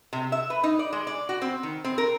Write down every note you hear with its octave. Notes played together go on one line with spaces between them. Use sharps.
C3
E5
B4
D#4
D5
G#3
D5
F#4
C4
D#3
C4
A#4